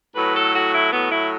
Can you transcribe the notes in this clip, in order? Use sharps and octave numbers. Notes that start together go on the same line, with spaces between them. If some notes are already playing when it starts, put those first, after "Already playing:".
A2 F#3 B4
A4
F#4
E4
A2 F#3 B3
E4